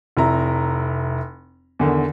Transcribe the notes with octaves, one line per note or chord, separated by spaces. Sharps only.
F1 E4 A#5
E2 D3 D#3